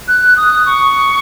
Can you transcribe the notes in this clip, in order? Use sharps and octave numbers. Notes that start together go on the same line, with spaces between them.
F#6
D#6
C#6